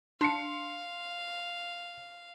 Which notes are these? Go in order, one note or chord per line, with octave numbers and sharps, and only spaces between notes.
D4 F5 C6 C7 C#7